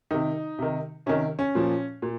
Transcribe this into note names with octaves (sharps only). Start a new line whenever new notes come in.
C3 D#3 D#4
C3 D#3
C3 D#3 C#4
C#4
A#2 F3
A#2